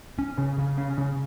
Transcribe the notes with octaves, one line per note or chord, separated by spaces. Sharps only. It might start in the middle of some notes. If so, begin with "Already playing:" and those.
C#4
C#3
C#3
C#4
C#3